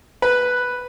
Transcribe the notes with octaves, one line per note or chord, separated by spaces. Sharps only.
B4